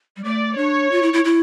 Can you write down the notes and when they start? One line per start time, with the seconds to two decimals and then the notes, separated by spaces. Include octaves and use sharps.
0.16 G3
0.24 A3 D5
0.57 D4 C#5
0.91 F4
1.02 E4
1.13 E4
1.25 E4